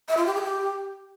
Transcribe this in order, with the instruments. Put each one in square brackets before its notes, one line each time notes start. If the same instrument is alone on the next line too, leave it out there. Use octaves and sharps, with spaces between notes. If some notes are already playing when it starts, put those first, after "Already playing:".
[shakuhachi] E5
F4
G4
G#4
G4